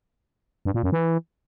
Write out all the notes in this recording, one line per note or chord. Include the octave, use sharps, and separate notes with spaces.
G2
A#2
F#2
E3